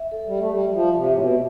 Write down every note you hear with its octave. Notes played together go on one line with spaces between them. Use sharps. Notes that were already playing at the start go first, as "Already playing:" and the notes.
Already playing: E5
A4
G3
A3 A4
G3
G3
F3 E5
C3
E5
A2
B2